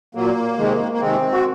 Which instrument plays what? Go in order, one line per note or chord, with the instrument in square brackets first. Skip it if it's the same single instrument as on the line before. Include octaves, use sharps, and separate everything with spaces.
[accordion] A#2 F#3 A#3
C3 D#3 G#3
A#3
C3 D#3 G#3 C4
F#4